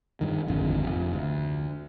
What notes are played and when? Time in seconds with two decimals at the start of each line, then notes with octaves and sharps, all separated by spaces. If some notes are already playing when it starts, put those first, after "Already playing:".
0.21 G2 D#3
0.48 D#1 G#1 F2 D3
0.84 F1
1.14 D2